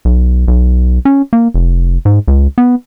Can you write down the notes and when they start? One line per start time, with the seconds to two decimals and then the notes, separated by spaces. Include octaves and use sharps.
0.05 B1
0.48 B1
1.05 C#4
1.33 A#3
1.54 F1
2.05 G#2
2.28 C#2
2.58 B3